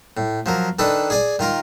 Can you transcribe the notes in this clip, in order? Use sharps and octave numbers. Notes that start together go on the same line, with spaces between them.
A2
F3 F#3 A#4
D#3 D4 A4 B4 D#6
G#4 D5 G#5
D#3 F4 A#4 C6